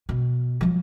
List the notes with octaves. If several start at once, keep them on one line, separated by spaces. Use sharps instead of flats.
B2
F3 F#3